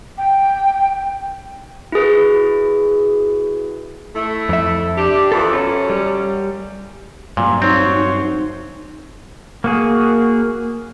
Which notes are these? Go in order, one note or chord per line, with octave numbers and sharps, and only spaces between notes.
G5
E4 F#4 G#4 B4
A3 E4
F2 E5
D4 G4
E2 E3 F3 A4
F#2 F#3 C#4
G3
G2 A#2 F#3
C4 D#4 F#4 C5 C#5
D#4
A#3 F#4 G#4